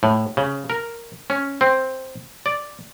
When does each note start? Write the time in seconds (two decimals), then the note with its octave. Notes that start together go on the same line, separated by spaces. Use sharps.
0.03 A2
0.37 C#3
0.70 A#4
1.30 C#4
1.61 C4
2.46 D5